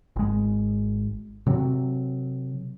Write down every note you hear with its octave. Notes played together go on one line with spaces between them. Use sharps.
G#1 G#3
C3 F#3 C4